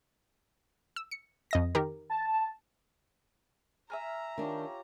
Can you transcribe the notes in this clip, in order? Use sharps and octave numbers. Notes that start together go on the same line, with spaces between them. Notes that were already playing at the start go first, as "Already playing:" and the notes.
E6
C#7
F2 D#5 A#6
D#3 G4 A#4
A5
E5 G#5 A#5 F6
D#3 D4 F4 G4 C#5